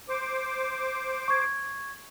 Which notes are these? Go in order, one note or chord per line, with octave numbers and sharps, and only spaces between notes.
C5 D6
C#6 G#6